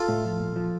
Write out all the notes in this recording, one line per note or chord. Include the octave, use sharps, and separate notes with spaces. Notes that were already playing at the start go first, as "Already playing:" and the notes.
Already playing: F4 A4
A2
F3
A#2
F3